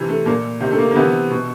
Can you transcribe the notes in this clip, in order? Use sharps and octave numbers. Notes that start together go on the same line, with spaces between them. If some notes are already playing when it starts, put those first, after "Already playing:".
Already playing: C3 E3
A3
A#2 A#3
C3 D#3
A3
A#3
A#3
C3 E3 B3
B2